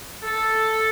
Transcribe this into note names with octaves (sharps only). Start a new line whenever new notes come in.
A4